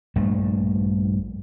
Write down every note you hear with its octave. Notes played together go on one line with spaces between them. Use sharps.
A#1 G2 A3